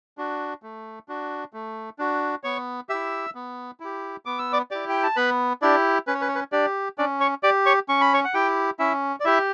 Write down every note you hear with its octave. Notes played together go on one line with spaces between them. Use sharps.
D4 F#4
A3
D4 F#4
A3
D4 F#4
B3 C#5 C#6
E4 G4 E5 E6
B3
E4 G4
B3 D6
E6
D5 D6
E4 G4 D5 D6
G5
A5
B3 B4 B5
D4 E4 G4 D5
C#4 B4
C#5
B4
C#5
B4
D4 G4 D5
C#4 D4 D5
C#5 C#6
G4 D5 D6
C#5 C#6
C#4 C#6
B5
C#5 C#6
F#5
E4 G4 G5
C#4 E4 E5
D5
E4 G4 E5